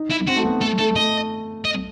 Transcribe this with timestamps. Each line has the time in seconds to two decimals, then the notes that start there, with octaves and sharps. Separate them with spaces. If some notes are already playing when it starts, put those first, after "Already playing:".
Already playing: D#4
0.11 E4
0.28 C4 F#4
0.36 A3
0.45 B3
0.61 A3 A4
0.79 A3 A4
0.96 A3 D#5
1.65 D#5